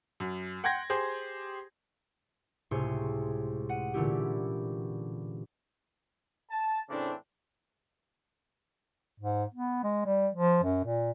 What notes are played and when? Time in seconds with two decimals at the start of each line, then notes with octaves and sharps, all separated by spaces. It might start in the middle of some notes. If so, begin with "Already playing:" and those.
0.20 F#2
0.64 F#5 G5 C6 G6 G#6 A#6
0.90 G4 G#4 C5
2.71 C#2 A2 C3 C5 C#5 G#5
3.69 F#5 D#7
3.94 A#2 D3 E3 C#4 E4 G4
6.50 A5
6.90 A2 C#3 E3 A3 C4 D4
9.20 G#2
9.54 B3
9.84 G#3
10.06 G3
10.34 F3
10.63 F#2
10.85 A#2